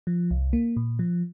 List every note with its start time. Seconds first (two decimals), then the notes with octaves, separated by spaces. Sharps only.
0.07 F3
0.31 C2
0.53 A#3
0.77 A#2
0.99 F3